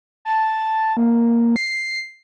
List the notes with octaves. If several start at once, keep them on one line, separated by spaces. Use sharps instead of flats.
A5
A#3
C7